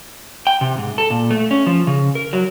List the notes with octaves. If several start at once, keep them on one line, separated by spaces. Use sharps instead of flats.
G5
C3
G#2
A4
A#2
A3
C#4
F3
C#3
A#4
F#3